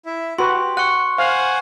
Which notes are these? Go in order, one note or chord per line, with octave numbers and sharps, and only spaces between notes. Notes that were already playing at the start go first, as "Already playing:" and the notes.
E4 E5
F#4 G4 B4 C6
F#5 C#6 F#6
C5 F5 F#5 G#5